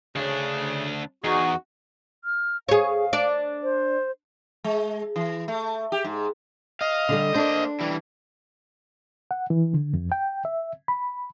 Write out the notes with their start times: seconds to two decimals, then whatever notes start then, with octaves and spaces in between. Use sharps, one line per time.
0.16 D2 C#3 D4
1.24 E2 D#4 F#4 G#4
2.24 F6
2.68 G#4 C#5 F5
3.13 D4 D5
3.63 C5
4.64 G#3
5.16 E3
5.48 A3
5.92 G4
6.04 G#2
6.81 D#5 F5
7.09 D3 G3
7.35 A#3 D4 C5
7.80 E3 G3
9.31 F#5
9.50 E3
9.74 D3
9.94 F2
10.12 G5
10.45 E5
10.88 B5